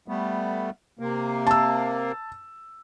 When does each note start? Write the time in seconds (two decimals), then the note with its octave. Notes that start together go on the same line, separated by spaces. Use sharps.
0.08 G3 A3 B3
0.99 C3 A#3
1.47 A5 E6